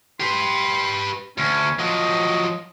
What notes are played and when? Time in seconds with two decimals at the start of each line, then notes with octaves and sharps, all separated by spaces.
0.20 G4 B4 C6
1.38 D2 C#4
1.79 F3 F#3 D#5